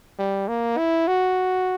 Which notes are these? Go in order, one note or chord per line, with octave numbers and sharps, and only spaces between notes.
G3
A#3
E4
F#4